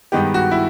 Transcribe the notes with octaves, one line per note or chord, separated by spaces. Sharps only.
G2 D#3 G#3 B3 G4
F#4
E4